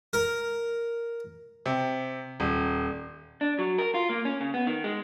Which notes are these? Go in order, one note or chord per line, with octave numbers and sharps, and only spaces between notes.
A#4
C3
D#1
D4
F#3
A#4
F4
A#3
C#4
C#3
B3
D#3
G#3